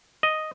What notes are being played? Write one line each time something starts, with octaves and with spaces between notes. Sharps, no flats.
D#5